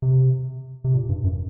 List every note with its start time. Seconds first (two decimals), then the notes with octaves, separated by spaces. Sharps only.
0.02 C3
0.84 C3
0.94 A#2
1.09 G2
1.24 F#2